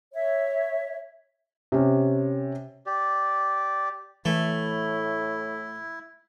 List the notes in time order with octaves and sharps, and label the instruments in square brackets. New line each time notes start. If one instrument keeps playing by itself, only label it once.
[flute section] C#5 E5
[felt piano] C3 C#4
[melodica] G4 D5
[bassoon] A2 [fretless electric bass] E3 [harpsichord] A3 [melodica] E4